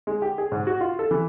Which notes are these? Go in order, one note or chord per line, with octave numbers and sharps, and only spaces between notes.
G#3
G4
G#4
G#2
F#4
F4
A4
E3